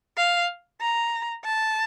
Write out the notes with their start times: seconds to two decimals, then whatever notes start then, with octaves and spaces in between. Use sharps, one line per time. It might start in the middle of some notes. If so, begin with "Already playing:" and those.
0.17 F5
0.81 A#5
1.45 A5